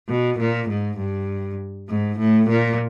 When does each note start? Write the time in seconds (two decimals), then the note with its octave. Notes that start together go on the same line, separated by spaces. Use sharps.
0.09 B2
0.39 A#2
0.69 G#2
0.98 G2
1.88 G#2
2.18 A2
2.48 A#2